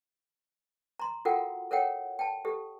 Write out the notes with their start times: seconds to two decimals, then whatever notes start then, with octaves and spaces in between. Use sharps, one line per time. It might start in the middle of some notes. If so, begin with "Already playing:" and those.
1.00 A#5 C6
1.25 F4 F#4 A4 A#4 F#5 G5
1.71 A4 A#4 C#5 F#5 G5
2.19 G5 A5
2.45 G4 A4